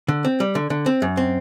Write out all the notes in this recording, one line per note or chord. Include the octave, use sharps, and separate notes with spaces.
D3
C4
G3
D3
D3
C4
F#2
C4